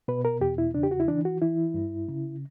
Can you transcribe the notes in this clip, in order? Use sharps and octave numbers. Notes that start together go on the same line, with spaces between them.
B2 B4
A#4
E2 G4
E4
C#3 D4
G4
F#4
E4
E3 D4
F#4
E3 E4
G2
C#3